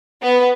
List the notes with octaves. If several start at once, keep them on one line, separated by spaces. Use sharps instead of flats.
B3